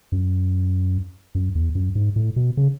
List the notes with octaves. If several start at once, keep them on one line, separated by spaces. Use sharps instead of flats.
F#2
F#2
E2
F#2
G#2
A2
B2
C#3